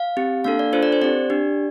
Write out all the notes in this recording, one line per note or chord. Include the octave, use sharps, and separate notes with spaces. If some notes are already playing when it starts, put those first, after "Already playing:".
Already playing: F5
C4 G4
A#3 D4 A4 F5
D5
D4 F4 A4 C5
D5
C5
C4 G4 D5
D4 G4